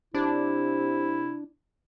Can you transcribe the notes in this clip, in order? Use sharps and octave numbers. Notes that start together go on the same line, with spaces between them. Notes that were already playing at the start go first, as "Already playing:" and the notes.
C3 D4 E4